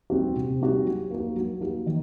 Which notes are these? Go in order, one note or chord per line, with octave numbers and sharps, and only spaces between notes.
G3 C4 F#4
C3
G3 C4 F#4
F#3
A#3 F#4
F#3
A#3 F#4
D#3